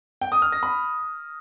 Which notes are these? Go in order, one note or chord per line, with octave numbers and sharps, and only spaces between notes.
G5
D#6
F6
A#6
B5